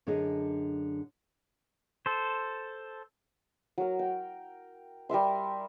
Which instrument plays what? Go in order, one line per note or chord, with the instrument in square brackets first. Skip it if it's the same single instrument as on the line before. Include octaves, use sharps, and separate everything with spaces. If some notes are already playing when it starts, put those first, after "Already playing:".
[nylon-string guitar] F#2 D3 D4 G#4 D#5
[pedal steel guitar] A4 C5
[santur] F#3 A#4
G5
G3 A#4 E5 C6